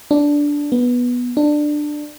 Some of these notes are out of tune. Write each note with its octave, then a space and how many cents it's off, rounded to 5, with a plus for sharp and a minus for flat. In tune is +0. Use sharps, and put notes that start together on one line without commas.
D4 -10
B3 -10
D4 +15